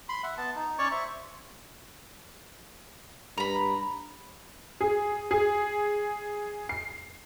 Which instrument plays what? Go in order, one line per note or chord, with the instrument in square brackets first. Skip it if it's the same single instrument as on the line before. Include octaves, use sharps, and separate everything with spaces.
[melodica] B5 C6
E5 F#5
B3 A5
D#4
C#4 C#5 D5 C#6
C5 E5 C#6
[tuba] G2 [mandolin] A#5 B5
[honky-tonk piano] G#4
G#4
C7